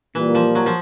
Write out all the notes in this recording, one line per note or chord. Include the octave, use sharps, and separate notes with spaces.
A#2 E3 G3 A#3
F3
F#3
F3